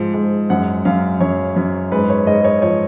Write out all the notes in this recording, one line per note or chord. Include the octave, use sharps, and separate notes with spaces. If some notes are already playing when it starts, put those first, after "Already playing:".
Already playing: G#2 F3
G#2
F#2 F#5
F#2 F5
F#2 C#5
F#2
G#2 B4
C#5
G#2 D#5
C#5
F3 C#5